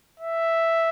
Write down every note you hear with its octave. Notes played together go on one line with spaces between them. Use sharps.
E5